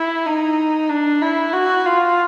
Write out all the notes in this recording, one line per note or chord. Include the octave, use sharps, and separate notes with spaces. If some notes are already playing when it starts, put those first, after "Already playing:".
Already playing: E4
D#4
D4
E4
F#4
F4